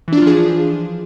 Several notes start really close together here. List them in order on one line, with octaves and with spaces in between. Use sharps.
E3 D4 F4 F3 G#4